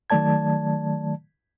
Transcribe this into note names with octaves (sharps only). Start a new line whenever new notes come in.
D#3 F#3 A3 D5 A5 G#6